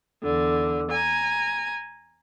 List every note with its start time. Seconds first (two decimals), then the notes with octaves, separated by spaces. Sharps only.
0.22 E2 D3
0.90 G#5 A#5